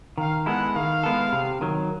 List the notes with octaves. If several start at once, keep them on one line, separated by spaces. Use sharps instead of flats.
D#3 F5
G#3 B3 E4 A4 F#5
D#3 F5
G#3 B3 E4 A4
C3
D#3 F#3